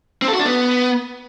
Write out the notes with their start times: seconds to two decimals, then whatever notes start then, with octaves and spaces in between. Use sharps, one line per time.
0.22 C4
0.28 A4
0.34 F#4
0.39 D4
0.45 B3